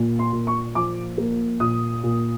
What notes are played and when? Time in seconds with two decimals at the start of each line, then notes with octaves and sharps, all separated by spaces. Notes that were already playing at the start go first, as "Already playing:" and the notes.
Already playing: A#2 A#3
0.19 C6
0.32 A#2
0.47 C#6
0.75 F3 D6
1.18 A#3
1.60 A#2 D#6
2.03 A#2